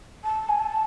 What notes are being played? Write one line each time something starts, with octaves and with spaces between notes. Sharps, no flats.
A5
G#5
A5